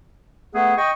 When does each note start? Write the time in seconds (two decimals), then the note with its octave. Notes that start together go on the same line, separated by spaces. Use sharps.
0.54 A3 B3 G#4
0.77 D#5 G5 C#6